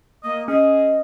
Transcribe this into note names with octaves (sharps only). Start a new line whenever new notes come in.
A#3 D#5
C#4 G#4 D#5